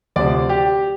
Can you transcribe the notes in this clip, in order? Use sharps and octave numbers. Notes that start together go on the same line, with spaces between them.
D2 C3 F3 D5
G4